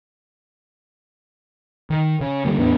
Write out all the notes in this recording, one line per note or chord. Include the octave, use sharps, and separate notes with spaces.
D#3
C#3
D3 E3 G3 A#3
E2 A2 B3 D4